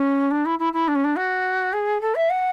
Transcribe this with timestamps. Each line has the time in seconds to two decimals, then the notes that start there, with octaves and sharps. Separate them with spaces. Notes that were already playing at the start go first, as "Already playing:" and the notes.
Already playing: C#4
0.31 D4
0.45 E4
0.59 E4
0.73 E4
0.88 D4
0.95 C#4
1.04 D4
1.16 F#4
1.73 G#4
2.01 A4
2.15 E5
2.30 F#5